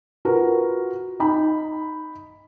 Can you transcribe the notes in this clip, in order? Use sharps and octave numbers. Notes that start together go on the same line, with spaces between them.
F4 F#4 A#4 B4
D#4 B5